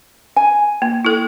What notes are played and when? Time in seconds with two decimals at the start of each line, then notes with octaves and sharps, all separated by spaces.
0.36 G#5
0.82 A#3
1.05 E4 A4